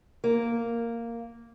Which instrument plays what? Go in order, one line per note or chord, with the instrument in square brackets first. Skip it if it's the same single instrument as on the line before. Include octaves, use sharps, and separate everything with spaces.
[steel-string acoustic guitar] A#3